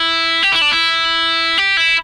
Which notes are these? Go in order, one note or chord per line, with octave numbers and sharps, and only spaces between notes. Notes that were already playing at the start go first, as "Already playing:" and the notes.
Already playing: E4
G4
E4
D4
E4
G4
E4